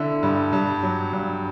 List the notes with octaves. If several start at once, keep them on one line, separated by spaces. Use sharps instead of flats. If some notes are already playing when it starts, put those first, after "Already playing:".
Already playing: D3 E4
G2
G2
F#3
G2